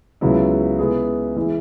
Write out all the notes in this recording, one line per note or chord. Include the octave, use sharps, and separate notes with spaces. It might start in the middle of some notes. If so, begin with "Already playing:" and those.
C#2 C#3 F#3 B3 E4
C#3 G#3 B3 E4 G#4
E3 G#3 E4